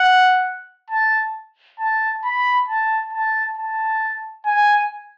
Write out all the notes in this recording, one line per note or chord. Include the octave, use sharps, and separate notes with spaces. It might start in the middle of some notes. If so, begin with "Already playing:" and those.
Already playing: F#5
A5
A5
B5
A5
A5
A5
G#5